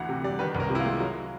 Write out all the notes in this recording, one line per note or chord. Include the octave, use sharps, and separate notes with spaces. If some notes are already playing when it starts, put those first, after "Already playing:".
Already playing: D2 E3 F#5
C3
G3 D5
D#3 B4
C2
A#4
C3
E4
F4
G#3
F#3